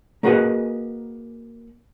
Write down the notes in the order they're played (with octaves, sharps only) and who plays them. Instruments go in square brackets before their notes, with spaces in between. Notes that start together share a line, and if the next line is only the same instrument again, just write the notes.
[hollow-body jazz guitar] A#3 F#4 G#4 B4 D#5 F#5